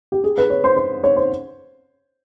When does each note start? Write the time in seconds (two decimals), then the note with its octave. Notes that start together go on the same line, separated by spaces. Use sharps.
0.12 G4
0.24 G#4
0.38 B4
0.50 C#5
0.64 C5
0.77 C5
1.04 C#5
1.16 C5